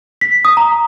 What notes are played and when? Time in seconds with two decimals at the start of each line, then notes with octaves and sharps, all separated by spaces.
0.21 B6
0.45 D#6
0.57 A#5